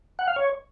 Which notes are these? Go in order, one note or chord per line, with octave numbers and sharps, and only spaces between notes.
F#5
F5
C#5